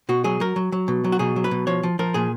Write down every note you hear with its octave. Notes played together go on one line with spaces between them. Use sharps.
B2 F#4
F#3 G#4
F#3 A#4
F#3
F#3
B2
F#3
F#4
B2 G#4
F#3
B4
B2
F3 C#5
F3
F3 A#4
A#2 G#4